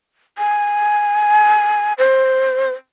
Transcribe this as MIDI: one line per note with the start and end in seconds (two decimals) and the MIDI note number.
0.38 1.93 80
1.98 2.72 72